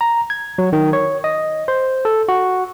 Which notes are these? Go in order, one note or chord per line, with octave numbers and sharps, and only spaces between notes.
A#5
G#6
F#3
D#3
C#5
D#5
C5
A4
F#4